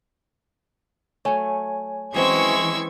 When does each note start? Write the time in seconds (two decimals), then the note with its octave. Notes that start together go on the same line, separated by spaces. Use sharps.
1.25 F#3 A3 C#5 G#5
2.14 E3 F#3 G#3 C4 C#4 C#6 E6 G#6